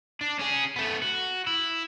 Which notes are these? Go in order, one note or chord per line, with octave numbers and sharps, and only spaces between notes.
D4
C#4 G#4
A3 B3
F#4
E4